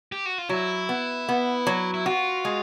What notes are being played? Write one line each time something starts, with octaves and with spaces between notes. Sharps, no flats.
G4
F#4
F4
F#3 E4
B3
B3
F#3
E4
F4 F#4
G#3